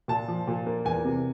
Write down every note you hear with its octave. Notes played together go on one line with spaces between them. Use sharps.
A#2 A5
F3
A#2
A#3
E2 G#5
C3